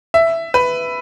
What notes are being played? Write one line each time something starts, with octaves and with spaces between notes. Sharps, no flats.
E5
B4